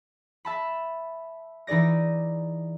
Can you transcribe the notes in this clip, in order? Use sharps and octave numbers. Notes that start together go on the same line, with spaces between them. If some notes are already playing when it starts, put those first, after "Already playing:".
E5 A5 B5
E3 D#4 G#4 D5 A#6